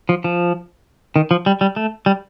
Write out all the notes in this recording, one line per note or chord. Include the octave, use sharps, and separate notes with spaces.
F3
F3
D#3
F3
G3
G3
A3
G3